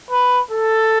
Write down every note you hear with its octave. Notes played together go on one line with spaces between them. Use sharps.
B4
A4